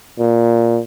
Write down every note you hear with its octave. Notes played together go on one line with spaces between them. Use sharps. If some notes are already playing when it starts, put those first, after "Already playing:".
A#2